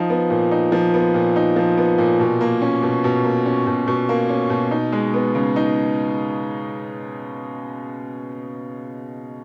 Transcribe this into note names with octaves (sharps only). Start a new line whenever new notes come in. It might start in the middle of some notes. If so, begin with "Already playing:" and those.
Already playing: F3 D#4
B3
A#2
D#4
F3
B3
A#2
D#4
F3
B3
A#2
B2
A#3
C#4
B2
B2
A#3
C#4
B2
B2
A#3
C#4
B2
D#4
G#3
B3
C#3
D#4